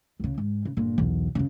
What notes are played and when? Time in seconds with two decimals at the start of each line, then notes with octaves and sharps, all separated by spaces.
0.20 C#2 C#3
0.38 G#2
0.65 C#3
0.77 G1 A#2
0.98 B1 E2
1.35 F#2 C#3